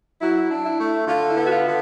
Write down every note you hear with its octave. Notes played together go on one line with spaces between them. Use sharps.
F#3 E4
D4
E4
A3
D3 F4
E4
B3
F#4
F4
D3